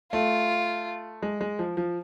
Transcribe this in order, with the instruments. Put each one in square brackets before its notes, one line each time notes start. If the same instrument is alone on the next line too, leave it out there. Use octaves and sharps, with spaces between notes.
[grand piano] A3 [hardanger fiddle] F4
[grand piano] G#3
G#3
F3
F3